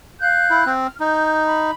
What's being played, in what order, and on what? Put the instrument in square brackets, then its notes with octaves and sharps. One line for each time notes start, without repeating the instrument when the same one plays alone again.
[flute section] F5 F#6 G6
[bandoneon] E4
C4
[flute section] F6
[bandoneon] D#4 [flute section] G6
[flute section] B5